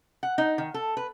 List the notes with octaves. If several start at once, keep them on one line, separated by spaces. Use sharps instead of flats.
F#5
D#4
D#3
A4
B4